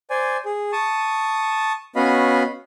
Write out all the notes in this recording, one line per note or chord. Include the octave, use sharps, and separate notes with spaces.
C5 D5 G#5
G#4
A5 C#6 D#6
B3 C#4 F#4 D#5 F5 B5